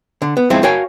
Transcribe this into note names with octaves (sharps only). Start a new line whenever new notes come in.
D3
B3
F3 G#3 C4 E4
F#4 A#4 C#5 F5 G5 G#5